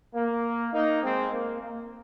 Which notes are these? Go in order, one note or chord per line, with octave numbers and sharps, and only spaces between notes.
A#3
A#3 D#4
G#3 C4
A#3
A#3